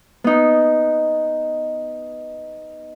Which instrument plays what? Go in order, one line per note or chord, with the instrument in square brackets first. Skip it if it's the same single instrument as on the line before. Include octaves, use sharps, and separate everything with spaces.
[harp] B3 D#4